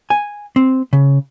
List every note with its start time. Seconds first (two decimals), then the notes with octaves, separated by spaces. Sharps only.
0.10 G#5
0.56 C4
0.93 C#3